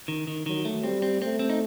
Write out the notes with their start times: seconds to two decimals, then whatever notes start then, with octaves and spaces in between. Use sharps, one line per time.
0.08 D#3
0.27 D#3
0.46 D#3 F#3
0.65 A3
0.83 G3 C4
1.02 C4
1.21 A3 C4
1.39 C4
1.50 D#4